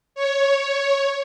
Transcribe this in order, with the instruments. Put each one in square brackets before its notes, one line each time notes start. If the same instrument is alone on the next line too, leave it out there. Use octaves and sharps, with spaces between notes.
[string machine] C#5